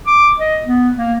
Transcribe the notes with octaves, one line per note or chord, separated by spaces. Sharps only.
D6
D#5
B3
A#3